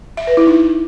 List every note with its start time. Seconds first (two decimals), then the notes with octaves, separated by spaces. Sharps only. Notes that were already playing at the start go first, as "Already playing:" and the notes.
0.17 E5
0.27 B4
0.37 E4
0.47 D#4